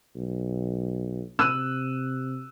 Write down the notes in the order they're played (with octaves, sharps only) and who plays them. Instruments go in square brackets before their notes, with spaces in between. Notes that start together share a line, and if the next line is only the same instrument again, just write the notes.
[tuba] B1
[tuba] C3 [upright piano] E6 F#6 D#7